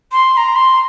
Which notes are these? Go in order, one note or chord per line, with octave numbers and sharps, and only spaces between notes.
C6
C6
A#5
C6